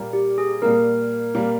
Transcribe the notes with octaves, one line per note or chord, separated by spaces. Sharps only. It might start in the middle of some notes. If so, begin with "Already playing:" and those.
Already playing: A#2 G3 A#3
G4
G#4
A#2 G3 A#3 A#4
A#2 G3 A#3